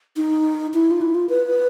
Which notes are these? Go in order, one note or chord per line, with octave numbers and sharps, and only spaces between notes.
D#4
E4
F4
E4
F4
B4